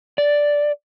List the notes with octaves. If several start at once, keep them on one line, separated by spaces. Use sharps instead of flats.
D5